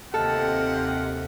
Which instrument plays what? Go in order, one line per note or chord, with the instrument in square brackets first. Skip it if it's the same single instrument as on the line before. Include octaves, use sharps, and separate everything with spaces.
[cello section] D#2 C3 [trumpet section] F4 F#5 [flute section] G4 D#5 F6 [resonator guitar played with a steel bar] A4